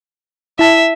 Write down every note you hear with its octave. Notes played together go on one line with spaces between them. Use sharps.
E4 E5 A5